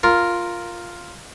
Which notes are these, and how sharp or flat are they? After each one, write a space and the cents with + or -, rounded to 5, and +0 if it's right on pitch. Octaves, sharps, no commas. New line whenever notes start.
F4 +0 A#4 +0